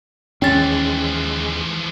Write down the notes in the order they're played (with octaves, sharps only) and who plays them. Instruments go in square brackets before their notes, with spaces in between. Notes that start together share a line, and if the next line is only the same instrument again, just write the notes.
[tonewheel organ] D#2 G#3 C6 [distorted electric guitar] E3 F3 [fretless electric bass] C#4 [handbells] G5 A6